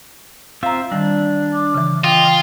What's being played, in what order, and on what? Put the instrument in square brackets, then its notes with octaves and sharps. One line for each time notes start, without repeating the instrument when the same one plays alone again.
[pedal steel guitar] C4 F4 E5 [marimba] F5 A#5
[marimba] D#3 G3 [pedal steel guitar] D4
[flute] D6
[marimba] C#3 E3
[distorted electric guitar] F4 [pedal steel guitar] D#5 [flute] G5